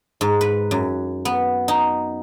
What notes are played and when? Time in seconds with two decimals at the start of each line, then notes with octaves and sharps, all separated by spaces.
0.21 G#2
0.41 B4
0.71 F#2
1.25 B3
1.68 D#4